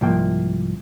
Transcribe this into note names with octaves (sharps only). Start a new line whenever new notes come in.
C2 G#2 F3 A#3 G5